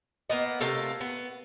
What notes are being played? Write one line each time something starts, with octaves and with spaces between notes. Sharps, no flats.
A#3 B3 D#5
C3 A3 A#3 F4
B3